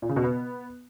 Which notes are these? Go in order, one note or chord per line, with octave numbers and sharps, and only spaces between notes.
A#2
C#3
B2
B3